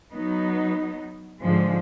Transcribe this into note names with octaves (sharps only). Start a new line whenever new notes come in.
F#3 B3 D#4
G#2 D3 F3 G#3